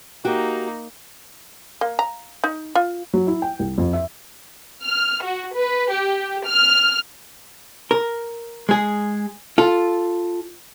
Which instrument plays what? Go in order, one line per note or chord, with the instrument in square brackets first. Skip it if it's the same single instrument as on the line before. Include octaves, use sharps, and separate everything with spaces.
[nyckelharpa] A#3 D#4 [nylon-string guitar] F#4 G4
[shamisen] A#3
A#5
D#4
F4
[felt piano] F#3
E4
G5
C2
F2
E5
[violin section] F6
F#4
B4
G4
F6
[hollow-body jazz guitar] A#4
G#3 G#4
F4 A4